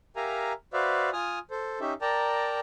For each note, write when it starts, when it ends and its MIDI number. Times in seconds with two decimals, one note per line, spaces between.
0.16 0.53 67
0.16 0.53 70
0.16 0.53 76
0.16 0.53 77
0.16 0.53 80
0.16 0.53 82
0.73 1.10 66
0.73 1.10 71
0.73 1.10 72
0.73 1.10 74
0.73 1.10 76
0.73 1.10 77
1.13 1.39 65
1.13 1.39 80
1.13 1.39 87
1.13 1.39 89
1.51 1.79 69
1.51 1.79 72
1.81 1.93 61
1.81 1.93 63
1.81 1.93 67
1.81 1.93 76
2.01 2.60 70
2.01 2.60 74
2.01 2.60 79
2.01 2.60 81
2.01 2.60 82